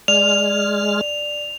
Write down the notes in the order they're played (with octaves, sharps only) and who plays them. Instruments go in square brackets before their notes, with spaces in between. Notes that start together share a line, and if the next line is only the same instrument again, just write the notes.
[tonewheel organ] G#3 F6 [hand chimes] D5 [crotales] F7